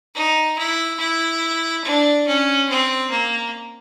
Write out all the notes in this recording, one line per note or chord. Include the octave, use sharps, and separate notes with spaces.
D#4
E4
E4
D4
C#4
C4
A#3